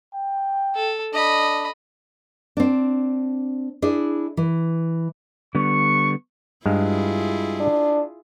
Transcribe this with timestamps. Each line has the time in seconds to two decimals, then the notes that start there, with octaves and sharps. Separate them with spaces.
0.14 G5
0.75 A4
1.13 D4 D#5 B5
2.57 C4 D4
3.82 D4 E4 G#4
4.37 E3
5.55 D3 G3 B3 C#6
6.66 G2 G#3 E4 F4 G#4 F5
7.60 D4